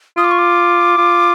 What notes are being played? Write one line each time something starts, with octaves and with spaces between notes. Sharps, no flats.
F4 D#6
D6
C#6
D6
F4